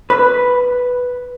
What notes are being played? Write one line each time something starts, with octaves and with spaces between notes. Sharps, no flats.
B4